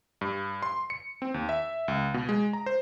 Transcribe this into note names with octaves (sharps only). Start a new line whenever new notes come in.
G2
C6
C#7
C4
D#2
E5
C#2
B2
G#3
A#5
C5